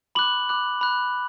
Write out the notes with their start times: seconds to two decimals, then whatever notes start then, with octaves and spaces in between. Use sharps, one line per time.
0.15 B5 D6 F#6 F#7
0.49 B5 D6 F#6
0.81 B5 F#6